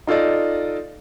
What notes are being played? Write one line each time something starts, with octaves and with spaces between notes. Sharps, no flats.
D#4 F4 A4 D5 D#5